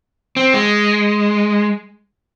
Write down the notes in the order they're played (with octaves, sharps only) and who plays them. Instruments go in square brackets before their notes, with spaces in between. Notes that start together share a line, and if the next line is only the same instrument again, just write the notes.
[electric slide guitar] C4
G#3